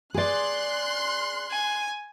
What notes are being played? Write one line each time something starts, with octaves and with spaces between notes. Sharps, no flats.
G#4 D5 C6 F#6
G#5